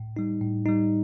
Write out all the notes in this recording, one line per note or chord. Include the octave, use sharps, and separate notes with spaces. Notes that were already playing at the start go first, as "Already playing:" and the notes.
Already playing: A2
G3 D#4
A2
G3 D#4